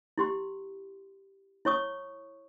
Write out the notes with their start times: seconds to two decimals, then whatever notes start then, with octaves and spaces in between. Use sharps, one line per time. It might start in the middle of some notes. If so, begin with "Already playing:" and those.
0.18 E4 G4 C6
1.65 E4 C#5 C#6 D#6